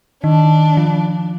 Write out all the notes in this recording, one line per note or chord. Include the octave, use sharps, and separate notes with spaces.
D#3 D4
F3